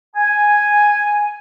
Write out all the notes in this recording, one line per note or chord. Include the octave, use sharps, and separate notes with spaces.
G#5